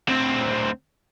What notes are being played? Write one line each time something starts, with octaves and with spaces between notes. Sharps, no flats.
D2 C4